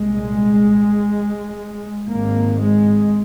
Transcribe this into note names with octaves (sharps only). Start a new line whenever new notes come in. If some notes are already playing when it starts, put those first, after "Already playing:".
Already playing: C2 A#2 G#3
G#1 G#2 A#3
G#3